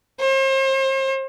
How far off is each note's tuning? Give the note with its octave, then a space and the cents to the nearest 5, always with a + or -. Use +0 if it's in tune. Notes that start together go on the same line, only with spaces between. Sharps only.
C5 +40